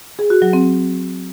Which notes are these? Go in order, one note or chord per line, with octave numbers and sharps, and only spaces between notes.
G#4
F#4
F#3
C4